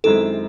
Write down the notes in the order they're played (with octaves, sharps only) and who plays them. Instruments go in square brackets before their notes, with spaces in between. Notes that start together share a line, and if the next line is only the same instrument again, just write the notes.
[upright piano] F#2 D#3 G#3 C4 E4 [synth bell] A4